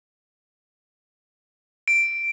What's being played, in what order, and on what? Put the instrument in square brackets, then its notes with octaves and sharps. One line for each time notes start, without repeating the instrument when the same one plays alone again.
[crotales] D7